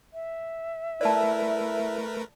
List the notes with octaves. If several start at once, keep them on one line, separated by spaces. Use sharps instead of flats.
E5
A3 E4 A#4 B4 D5 A5